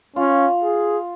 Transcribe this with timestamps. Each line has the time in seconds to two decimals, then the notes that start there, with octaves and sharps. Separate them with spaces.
0.16 C#4 F4
0.63 G#4